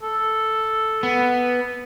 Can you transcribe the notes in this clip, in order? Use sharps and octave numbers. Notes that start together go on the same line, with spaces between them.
A4
B3